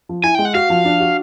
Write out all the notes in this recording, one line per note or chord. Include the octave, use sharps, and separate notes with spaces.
F3
E4 G#5
G#3 G5
F#5
F#4 F5
F3
D4
F#4